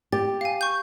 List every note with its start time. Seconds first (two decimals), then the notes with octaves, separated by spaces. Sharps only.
0.12 G4 A6
0.41 F5 G#5
0.61 C#6 G6